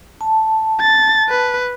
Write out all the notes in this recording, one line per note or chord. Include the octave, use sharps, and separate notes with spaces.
A5
A6
B4